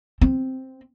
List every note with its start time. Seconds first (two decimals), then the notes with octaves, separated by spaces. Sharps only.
0.21 C4